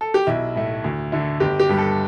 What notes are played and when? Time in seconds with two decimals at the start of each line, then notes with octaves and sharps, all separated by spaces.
0.01 A4
0.14 G4
0.27 B1 E4
0.55 A2 A3
0.84 D2
1.12 D3 A3
1.40 G1 G4
1.60 G4
1.69 G2 G3
1.78 A4